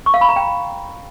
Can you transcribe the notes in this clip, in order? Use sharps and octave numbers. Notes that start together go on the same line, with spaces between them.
C#6
F5
B5
A#5
G5